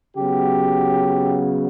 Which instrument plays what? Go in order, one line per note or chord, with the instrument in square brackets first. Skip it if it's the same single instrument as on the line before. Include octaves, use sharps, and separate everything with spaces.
[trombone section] C#3 F#3 B3 G4